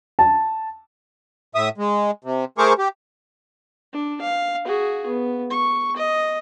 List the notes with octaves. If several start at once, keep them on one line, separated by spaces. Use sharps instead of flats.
A5
A2 E5 D#6
G#3
C3
A3 G#4 A#4 C5 C#6 D6
G4
D4
F5
F#4 G#4
B3
C#6
D#5